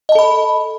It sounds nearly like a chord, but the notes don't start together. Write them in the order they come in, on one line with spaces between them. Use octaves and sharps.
D#5 A5 A4 B5